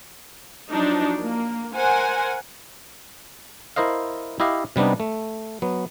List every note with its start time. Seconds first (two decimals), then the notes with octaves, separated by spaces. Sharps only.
0.70 F3 F#3 D4 D#4
1.19 A#3
1.74 A#4 C5 F#5 G#5
3.76 E4 A#4 C5 D#5 F5
4.40 E4 G4 D#5 F5
4.76 C3 G3 B3 D4 D#4
5.00 A3
5.62 F#3 B3